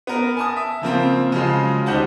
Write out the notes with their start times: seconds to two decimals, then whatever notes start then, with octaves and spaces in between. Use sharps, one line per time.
0.07 B3 A#4
0.37 G#5 A5 D#6
0.56 E5
0.82 C#3 F3 A#3 C4
1.32 C#3 F3 F#3 G#3
1.86 D2 D#4 G4 C5 F#5 A5